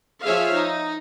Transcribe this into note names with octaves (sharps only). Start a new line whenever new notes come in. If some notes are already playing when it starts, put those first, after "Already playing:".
F3 G#4 C#5 E5 F5
D#4